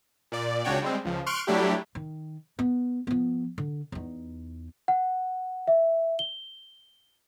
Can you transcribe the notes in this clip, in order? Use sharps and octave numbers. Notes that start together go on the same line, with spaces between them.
A#2 D5
C#2 C#3 D4 F#4 C#5 G5
G3 G#3 C4
C#2 F3
C6 C#6 F6 F#6 D7
F#3 G3 A3 D4 E4 G4
D#3
B3
F3 B3
D3
E2 D#4
F#5
E5
G7